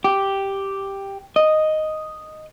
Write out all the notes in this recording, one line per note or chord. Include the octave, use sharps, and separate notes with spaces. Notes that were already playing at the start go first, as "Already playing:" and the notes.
G4
D#5